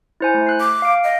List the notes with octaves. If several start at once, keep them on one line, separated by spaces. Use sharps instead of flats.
E4 C5 G#5
A3
F#6 C7
D6
F5 D7
D#5